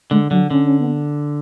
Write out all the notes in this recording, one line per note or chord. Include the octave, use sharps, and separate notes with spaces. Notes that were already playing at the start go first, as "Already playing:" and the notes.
D3 G#3
D3 F#3
D3 C#4
C#4
B3